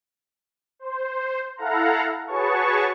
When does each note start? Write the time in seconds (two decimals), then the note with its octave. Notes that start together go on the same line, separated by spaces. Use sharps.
0.79 C5
1.57 E4 A4 F5 F#5 A#5
2.27 F#4 G#4 B4 C#5 A5 C#6